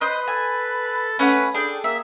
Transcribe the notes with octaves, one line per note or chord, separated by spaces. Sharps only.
B4 C5 D#5
A4 G#5
A3 C#4 B4 F#5
D4 G#4 A4 G5
A#3 E5